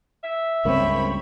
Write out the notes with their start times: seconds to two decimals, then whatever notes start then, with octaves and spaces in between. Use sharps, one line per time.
0.24 E5
0.65 C#2 G2 A#3 C4 C#5 B5